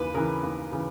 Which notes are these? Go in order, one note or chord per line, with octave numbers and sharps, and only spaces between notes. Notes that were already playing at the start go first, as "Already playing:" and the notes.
Already playing: D#2 C#3 E3 B4
C#3 E3 A#4
D#2
C#3 E3